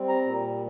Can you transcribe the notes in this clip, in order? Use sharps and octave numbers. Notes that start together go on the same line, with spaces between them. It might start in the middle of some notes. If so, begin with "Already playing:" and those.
Already playing: G3 C4
A#5
A#2